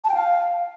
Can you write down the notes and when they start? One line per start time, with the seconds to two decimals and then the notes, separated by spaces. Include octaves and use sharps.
0.04 A5
0.09 G5
0.14 F5